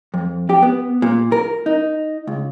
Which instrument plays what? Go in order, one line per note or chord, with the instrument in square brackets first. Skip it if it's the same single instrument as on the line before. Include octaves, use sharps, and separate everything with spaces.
[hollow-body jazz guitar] F2
G4
B3
A#2
A#4
D#4
C#2